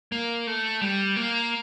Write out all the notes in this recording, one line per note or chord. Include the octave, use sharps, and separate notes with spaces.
A#3
A3
G3
A#3